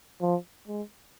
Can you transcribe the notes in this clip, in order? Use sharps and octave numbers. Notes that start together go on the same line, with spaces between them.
F3
G#3